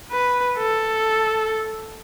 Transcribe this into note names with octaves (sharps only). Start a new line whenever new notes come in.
B4
A4